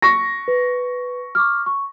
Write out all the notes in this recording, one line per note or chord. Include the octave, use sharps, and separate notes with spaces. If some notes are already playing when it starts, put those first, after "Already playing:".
C#6 A#6
B4
C#6 D6 F6
C#6